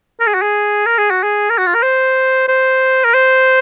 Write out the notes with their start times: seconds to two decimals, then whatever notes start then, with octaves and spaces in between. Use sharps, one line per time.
0.20 A#4
0.27 G#4
0.34 F#4
0.42 G#4
0.86 A#4
0.98 G#4
1.11 F#4
1.23 G#4
1.50 A#4
1.58 F#4
1.66 F4
1.74 A#4
1.83 C5
2.48 C5
3.05 A#4
3.14 C5